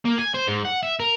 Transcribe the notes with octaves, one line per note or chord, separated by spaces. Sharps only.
A#3
G#5
C5
G#2
F#5
E5
A#4